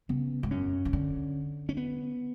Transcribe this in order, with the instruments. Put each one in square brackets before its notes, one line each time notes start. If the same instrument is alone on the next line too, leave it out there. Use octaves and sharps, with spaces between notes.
[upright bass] C#3 [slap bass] B3
[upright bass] G#2
[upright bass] F#2 [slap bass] C#4
[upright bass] E3
D3
[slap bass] C#4
B3